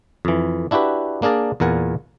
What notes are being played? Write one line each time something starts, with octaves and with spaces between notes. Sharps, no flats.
F2 E3
D4 E4 F#4 G4 B4
A#3 D4 G#4 A#4 D5
E2 A#2 A#4 F#5 G#5